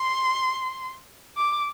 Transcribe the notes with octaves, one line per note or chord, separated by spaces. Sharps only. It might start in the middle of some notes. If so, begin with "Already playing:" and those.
Already playing: C6
D6